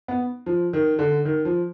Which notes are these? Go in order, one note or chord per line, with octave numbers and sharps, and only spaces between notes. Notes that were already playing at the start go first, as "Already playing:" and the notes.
B3
F3
D#3
D3
D#3
F3